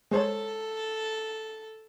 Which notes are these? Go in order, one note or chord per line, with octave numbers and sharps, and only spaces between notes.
G#3 A4 C5 C#5